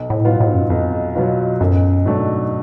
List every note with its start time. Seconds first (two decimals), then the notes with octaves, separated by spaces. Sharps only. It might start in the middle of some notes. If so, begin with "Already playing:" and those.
Already playing: B1
0.10 A2
0.25 B2 F#3 B3 F4
0.40 A2
0.47 G#2
0.54 F#2
0.62 G#2
0.70 B1 F2
1.15 B2 F#3 B3 F4
1.60 B1 F#2
2.05 G#2 B2 F#3 A3 D4